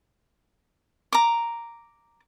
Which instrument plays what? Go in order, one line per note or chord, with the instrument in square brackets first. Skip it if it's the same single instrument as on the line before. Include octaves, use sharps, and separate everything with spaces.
[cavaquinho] A#5 D6